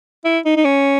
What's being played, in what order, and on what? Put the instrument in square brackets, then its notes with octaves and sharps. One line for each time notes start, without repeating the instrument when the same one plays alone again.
[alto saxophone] E4
D#4
D#4
C#4